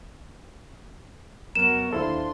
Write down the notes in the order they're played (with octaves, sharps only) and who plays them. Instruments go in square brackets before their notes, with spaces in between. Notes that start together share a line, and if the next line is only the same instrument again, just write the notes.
[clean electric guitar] F#2 B3 [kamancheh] F#4 A#4 [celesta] E7
[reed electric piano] D#2 E4 A4 [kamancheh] D4 C6 [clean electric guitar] F4 C5